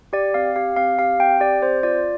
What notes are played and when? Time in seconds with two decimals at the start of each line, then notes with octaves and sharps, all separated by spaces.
0.13 G4 D5
0.34 C4 F5
0.56 G4 F5
0.76 C4 F5
0.99 G4 F5
1.19 C4 G5
1.40 G4 D5
1.62 C4 C5
1.83 F4 D5